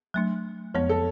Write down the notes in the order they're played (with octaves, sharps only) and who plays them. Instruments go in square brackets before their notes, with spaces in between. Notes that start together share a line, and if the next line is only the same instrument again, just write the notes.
[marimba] F#3 A3 D4
[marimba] F2 F3 G#3 B3 [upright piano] C#5
[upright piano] A4